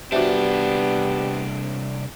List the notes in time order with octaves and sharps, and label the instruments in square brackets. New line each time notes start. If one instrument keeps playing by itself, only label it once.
[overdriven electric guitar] C2 D4 [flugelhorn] B3 [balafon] F#4 C5 E5 [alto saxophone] G4